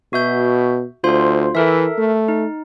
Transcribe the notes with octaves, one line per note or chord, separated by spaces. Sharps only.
B2 F#4 E5 G6
D2 F4 C5 C6
E3 A4 A#4 E5
A3
D#4